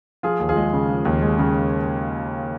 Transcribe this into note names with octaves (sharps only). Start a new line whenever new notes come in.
F3 F4 G#4
D#2
F4 G#4
G#3
C#3
F3
D#2
G#3
C#3